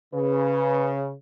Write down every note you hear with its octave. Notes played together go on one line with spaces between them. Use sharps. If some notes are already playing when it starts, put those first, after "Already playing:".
C#3 B4